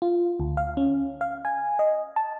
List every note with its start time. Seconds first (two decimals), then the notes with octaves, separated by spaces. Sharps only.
0.02 F4
0.40 D2
0.57 F5
0.77 C#4
1.21 F5
1.45 G#5
1.79 D#5
2.16 A5